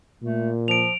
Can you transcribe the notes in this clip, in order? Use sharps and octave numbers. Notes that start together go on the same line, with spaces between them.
A#2 A3
F3 D7 F7